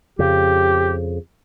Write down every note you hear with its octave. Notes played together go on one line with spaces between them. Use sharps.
F2 C#3 G4